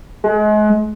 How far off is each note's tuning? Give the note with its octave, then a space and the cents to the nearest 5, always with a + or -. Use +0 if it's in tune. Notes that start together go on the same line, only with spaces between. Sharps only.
G#3 +35